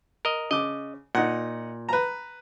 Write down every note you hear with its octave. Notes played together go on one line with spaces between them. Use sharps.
A#4 D#5
C#3 D#5 D6
A#2 D#4 F#5
B4 A#5